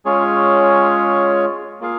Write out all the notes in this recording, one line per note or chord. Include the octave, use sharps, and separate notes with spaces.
G#3 C#4 F4 G#4 C#5
A#3 F4 G#4 F5